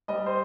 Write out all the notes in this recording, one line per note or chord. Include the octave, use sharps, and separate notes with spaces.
G3 D#5
C5